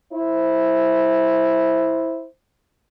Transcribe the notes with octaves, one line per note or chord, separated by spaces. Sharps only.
E4 C5